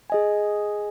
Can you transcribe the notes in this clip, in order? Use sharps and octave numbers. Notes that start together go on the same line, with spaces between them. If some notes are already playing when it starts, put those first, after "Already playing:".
G#4 D#5 G#5